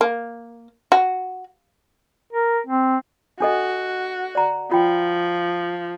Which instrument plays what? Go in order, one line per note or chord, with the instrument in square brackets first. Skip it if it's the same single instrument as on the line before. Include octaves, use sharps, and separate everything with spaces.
[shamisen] A#3
F#4
[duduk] A#4
C4
[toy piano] D4 A4 D#5 [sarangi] F#4
[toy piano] D5 A#5
[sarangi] F3 [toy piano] F4 G5